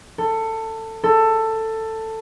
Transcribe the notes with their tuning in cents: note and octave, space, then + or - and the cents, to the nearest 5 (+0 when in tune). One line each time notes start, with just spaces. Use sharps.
A4 +20
A4 +15